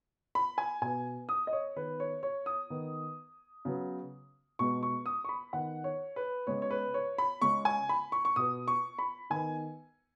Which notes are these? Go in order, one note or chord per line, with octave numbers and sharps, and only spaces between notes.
B5
G#5
B2 B3 G#5
D#6
D#5
C#5
D#3 B3 B4
C#5
C#5
D#6
D#3 B3
C#3 F#3 B3
B2 G#3 B3 C#6
C#6
D#6
C#6
B5
D#3 B3 F#5
C#5
B4
C#3 G#3 B3 C#5
C#5
B4
C#5
B5
C#3 G#3 C#4 C#6
G#5
B5
C#6
C#6
B2 B3 D#6
C#6
B5
D#3 B3 G#5